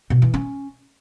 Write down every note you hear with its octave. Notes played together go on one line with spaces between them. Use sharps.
B2
E3
C#4